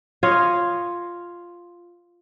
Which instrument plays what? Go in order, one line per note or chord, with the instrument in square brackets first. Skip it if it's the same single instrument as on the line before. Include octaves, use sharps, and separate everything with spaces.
[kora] F4 C#5 D#5 F5